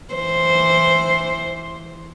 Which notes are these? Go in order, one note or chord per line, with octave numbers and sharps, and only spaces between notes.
E3 C5